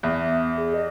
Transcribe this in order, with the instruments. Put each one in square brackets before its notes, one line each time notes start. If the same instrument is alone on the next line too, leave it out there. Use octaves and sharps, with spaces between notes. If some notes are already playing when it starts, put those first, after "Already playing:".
[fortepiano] E2 [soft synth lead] E5
[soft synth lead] G#4
D#5